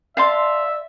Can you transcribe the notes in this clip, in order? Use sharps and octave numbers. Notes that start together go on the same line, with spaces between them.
D5 E5 F5 A5 C6